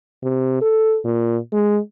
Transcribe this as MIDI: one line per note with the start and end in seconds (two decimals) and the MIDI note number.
0.23 0.57 48
0.62 0.99 69
1.04 1.37 46
1.53 1.79 56